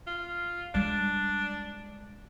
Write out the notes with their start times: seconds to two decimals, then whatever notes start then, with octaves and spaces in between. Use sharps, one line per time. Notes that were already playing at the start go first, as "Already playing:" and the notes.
0.07 F4
0.74 G3 G#3 D4